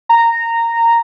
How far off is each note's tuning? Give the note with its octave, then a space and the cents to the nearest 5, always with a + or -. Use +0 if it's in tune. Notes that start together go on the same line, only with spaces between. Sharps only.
A#5 -10